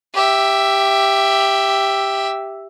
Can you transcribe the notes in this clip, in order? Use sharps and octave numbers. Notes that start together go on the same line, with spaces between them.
G4 E5